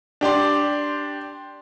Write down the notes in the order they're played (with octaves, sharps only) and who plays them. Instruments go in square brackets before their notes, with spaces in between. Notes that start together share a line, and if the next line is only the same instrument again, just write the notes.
[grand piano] D4 G4 D5 C6